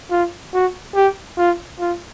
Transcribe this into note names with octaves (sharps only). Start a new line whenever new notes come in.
F4
F#4
G4
F4
F4